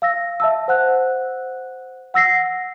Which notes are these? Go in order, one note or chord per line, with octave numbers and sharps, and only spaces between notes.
F5 E6 A#6
E5 A5 E6
C5 F#5 F#6
F#5 E6 A#6 C7